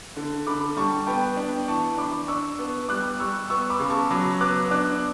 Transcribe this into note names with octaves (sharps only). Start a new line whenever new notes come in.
D3
D3 B5 D6
G3 A5 C#6
B3 G5 B5
D4
E3 A5 C#6
D4 B5 D6
D4 C#6 E6
B3
G3 D6 F#6
G3 C#6 E6
B3 C#6 E6
B5 D6
C#3
A5 C#6
F#3 B5 D6
B3 D6 F#6
D4 D6 F#6